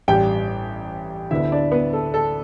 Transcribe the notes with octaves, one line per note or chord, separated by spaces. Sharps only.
A1 G2 G3 G4 G5
D2 D3 B3 E4 E5
D4 D5
B3 B4
A4
A4